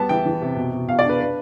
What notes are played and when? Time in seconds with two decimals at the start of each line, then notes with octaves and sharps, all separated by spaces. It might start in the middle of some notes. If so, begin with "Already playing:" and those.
Already playing: G3 B3 A5
0.09 E3 G5
0.26 E3
0.42 C3
0.56 B2
0.72 B2
0.88 B2 F5
0.99 D5
1.05 D4 B4
1.20 B4